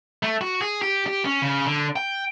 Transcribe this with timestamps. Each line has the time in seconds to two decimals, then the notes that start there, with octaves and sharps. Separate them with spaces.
0.23 A3
0.41 F#4
0.62 G#4
0.82 G4
1.06 G4
1.25 C#4
1.42 C#3
1.66 D3
1.96 G5